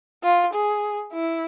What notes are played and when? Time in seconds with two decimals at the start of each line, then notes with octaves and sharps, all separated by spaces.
0.23 F4
0.53 G#4
1.13 E4